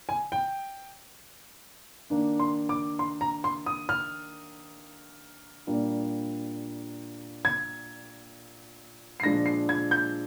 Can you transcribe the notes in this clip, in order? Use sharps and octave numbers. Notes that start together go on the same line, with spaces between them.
G#5
G5
D#3 A#3 D4
C6
D6
C6
A#5
C6
D#6
F6
A#2 G3 A#3 D4
G#6
C7
A#2 F3 G#3 D4 A#6
C7
G#6
G6